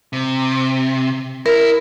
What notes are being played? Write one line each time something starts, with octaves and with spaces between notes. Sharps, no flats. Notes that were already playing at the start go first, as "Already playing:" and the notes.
C3
E4 A#4